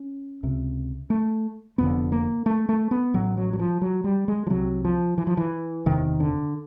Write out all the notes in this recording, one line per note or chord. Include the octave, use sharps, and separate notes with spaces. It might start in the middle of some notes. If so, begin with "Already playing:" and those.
Already playing: C#4
C#2 C3
A3
F1 F2 D3 B3
A#3
A3
A3
B3
A1 A2 F#3
F#3
F#3
F3
F#3
G3
G#3
F3
C2 C3 F#3
F3
E3
F3
E3
F#1 E2 C3 D#3
D3